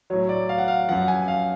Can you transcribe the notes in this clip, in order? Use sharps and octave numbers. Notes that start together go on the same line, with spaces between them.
A2 F#3 C#5
D5
F5
F#5
F5
F#2 F3 F#5
G#5
F5